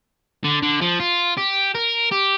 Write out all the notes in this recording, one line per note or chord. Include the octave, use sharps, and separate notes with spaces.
D3
D3
F3
F4
G4
A#4
G4